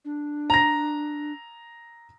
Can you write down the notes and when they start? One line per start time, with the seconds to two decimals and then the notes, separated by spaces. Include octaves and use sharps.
0.05 D4
0.50 A#5 A#6